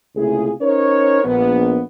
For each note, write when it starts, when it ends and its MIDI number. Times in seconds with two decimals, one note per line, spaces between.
0.16 0.52 37
0.16 0.52 48
0.16 0.52 57
0.16 0.52 64
0.16 0.52 65
0.16 0.52 68
0.61 1.21 61
0.61 1.21 63
0.61 1.21 70
0.61 1.21 72
0.61 1.21 73
1.24 1.80 34
1.24 1.80 59